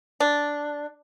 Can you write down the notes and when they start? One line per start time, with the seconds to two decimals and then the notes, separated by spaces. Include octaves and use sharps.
0.20 D4